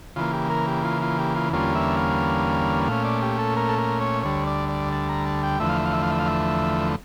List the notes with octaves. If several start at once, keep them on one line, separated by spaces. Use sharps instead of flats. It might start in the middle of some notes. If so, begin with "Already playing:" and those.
C#3 E3 A#3 F4
G4
A#4
G4
F4
F4
G4
F4
E2 D3 G3 A#3 C#4 F4
E5
F5
A#2 A3 C#4 F5
D5
G4
A4
A#4
A4
A#4
C#5
D2 D3 G3 C#5
D5
D5
A5
A#5
A5
G5
E2 D3 F3 A3 E5
F5
E5
F5
E5
F5
E5
F5
E5